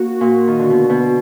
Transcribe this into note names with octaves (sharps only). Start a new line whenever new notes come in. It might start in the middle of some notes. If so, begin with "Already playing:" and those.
Already playing: A#3 F#4
A#2
D#3
D3
B2
B2